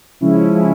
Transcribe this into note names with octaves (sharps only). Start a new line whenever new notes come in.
C#3 F3 G#3 C#4 E4
C#3 F3 G#3 C#4 E4